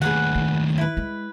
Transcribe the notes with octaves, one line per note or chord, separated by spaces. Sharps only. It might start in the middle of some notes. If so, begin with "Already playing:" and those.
D#2 A2 G#4 B4 F#5
D#3
E4 B4
G#3